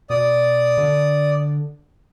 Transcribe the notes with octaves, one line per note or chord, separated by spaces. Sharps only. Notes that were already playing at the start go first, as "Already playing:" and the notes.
B2 D5 D#6
D3